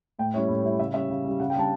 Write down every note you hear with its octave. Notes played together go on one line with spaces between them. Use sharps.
A2 G5
G3 C#4 E4 C#5
A2
G3 C#4 E4
C#3 E5
G3 C#4 E5
C#3
G3 C#4
C#3 F#5
G5
G3 D4 A5